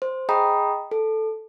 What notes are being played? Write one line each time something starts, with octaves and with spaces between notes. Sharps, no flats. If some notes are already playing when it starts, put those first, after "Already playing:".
C5
G#4 D#5 G5 A#5 B5 D#6
A4